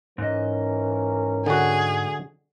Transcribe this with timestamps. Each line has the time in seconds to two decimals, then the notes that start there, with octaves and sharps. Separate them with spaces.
0.18 G#2 E3 C#4 A#4 D#5
1.46 D3 F#4 G#4